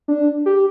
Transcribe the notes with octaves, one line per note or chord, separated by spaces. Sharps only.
D4
G4